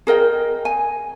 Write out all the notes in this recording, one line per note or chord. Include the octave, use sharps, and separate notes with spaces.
G#4 A#4 D#5 G5
G#5